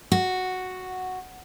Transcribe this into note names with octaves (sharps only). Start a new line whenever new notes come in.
F#4